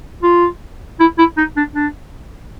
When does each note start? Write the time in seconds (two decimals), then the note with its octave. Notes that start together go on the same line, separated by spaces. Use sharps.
0.23 F4
1.00 E4
1.18 E4
1.37 D#4
1.57 D4
1.75 D4